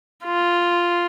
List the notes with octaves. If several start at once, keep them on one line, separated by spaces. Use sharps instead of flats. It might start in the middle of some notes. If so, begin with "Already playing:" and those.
F4